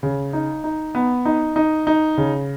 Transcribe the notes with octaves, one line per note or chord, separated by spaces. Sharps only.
C#3
D#4
D#4
B3
D#4
D#4
D#4
C#3